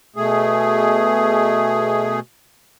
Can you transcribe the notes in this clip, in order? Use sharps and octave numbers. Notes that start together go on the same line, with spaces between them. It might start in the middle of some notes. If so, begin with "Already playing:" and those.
B2 A3 G#4